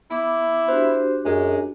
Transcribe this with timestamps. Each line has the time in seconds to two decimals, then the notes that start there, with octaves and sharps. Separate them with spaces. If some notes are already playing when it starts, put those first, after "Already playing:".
0.10 B3 E4 B5 D6
0.68 D4 F#4 G4 C5
1.25 F#2 G#3